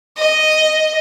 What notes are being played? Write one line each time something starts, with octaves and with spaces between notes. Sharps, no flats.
D#5